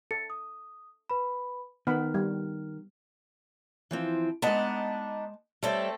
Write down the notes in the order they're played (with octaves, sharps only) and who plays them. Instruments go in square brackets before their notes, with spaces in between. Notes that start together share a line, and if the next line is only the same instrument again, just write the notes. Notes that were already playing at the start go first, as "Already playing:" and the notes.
[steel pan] A4 [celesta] A6 C#7
[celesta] D#6
B4 B5
[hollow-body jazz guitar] D#3 [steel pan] B3 F#5 B5 [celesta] F6
[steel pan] G3
[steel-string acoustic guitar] E3 F3 C4
[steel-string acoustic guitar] G#3 A5 [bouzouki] B3 D4 D#4
[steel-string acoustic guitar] G3 C#5 E5 [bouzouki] A3 C4 A4